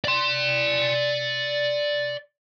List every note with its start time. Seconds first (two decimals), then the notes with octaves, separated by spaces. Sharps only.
0.05 D5 C6